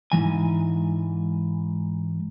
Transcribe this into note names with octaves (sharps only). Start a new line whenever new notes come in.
G#2 E3 G#5